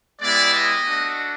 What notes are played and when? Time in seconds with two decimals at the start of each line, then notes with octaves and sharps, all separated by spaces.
0.20 G#3 B3 E4 G4 D5
0.53 D#5
0.85 A3 D4 F#4